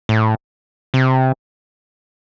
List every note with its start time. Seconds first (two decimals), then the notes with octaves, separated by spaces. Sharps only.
0.09 A2
0.94 C3